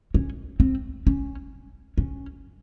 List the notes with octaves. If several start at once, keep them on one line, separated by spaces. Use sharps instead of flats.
C#4
C4
C#4
C#4